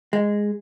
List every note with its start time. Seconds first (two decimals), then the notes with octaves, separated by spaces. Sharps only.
0.13 G#3